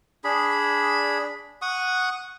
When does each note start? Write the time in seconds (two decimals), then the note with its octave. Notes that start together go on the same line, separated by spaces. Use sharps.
0.24 D4 G#4 B5
1.62 F#5 C#6 D#6